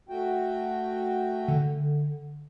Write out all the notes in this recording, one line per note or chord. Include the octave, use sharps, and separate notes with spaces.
A3 F#4 G5
D3